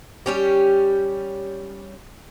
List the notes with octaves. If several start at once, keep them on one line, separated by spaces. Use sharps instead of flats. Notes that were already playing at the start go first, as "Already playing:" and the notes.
G3 C#4 G4